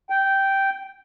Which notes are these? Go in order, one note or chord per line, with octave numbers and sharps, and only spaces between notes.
G5